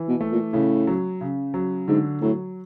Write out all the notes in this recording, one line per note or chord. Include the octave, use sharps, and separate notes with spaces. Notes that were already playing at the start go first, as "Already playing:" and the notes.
Already playing: E3
B2
A3
A#2
A2 C#3
F#3
C#3
F#3
G#2 D3
A2 F#3